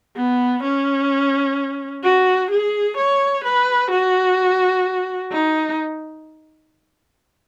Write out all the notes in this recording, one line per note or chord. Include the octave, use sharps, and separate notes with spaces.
B3
C#4
F#4
G#4
C#5
B4
F#4
D#4